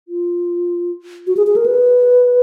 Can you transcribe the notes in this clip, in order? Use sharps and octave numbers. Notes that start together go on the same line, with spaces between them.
F4
F#4
G#4
G#4
A#4
B4